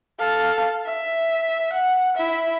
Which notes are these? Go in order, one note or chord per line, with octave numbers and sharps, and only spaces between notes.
A4 F5
E5
F#5
E4 E5